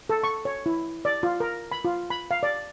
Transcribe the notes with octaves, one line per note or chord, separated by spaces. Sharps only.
A4
C#6
C#5
E4
D5
F4
A#4
B5
F4
B5
F5
D5